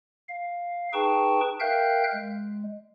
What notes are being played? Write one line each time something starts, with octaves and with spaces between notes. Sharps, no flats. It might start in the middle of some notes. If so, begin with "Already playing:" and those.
F5
D#4 G#4 B4 G5 A5 C#6
A#4 E5 F5 G5 F#6 G6
G#3